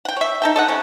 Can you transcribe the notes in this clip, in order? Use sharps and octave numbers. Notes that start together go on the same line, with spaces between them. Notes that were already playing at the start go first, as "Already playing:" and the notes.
F#5 G5
C#5 E5
D#4 A4 G5
A4 D#5 F#5
C3 G#3 C#4